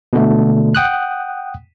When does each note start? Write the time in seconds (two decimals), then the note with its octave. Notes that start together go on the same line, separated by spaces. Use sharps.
0.13 B2 D3 A3
0.75 F#5 G5 D#6 F#6